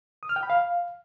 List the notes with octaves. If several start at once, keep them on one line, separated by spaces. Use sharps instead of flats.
D#6
F6
G5
B5
F5